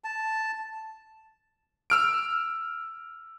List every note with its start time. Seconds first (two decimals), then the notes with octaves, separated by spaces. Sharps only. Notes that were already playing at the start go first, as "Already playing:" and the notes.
0.04 A5
1.90 E6 F6 D7